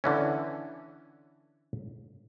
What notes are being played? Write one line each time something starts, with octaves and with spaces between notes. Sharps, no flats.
D3 E3 C#4